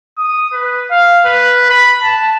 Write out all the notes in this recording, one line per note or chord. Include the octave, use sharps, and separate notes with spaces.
D#6
B4
F5
B4
B5
A5